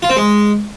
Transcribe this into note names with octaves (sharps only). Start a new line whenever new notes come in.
F4
C4
G#3